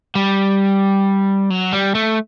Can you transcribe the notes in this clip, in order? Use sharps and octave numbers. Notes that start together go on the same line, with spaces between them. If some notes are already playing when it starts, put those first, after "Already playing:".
G3
F#3
G3
A3